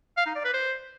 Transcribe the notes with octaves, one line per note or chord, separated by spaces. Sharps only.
F5
D#4
D5
B4
C5